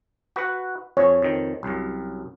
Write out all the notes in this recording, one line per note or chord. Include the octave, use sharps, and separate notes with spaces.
F#4 B4 F#5
F2 C#5
F2 D#3
C2 F#2